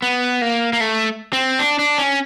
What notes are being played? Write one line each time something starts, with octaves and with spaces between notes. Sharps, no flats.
B3
A#3
A#3
A3
C4
D4
D4
C#4